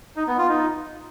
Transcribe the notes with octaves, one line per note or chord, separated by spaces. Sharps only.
D#4
B3
F4
D#4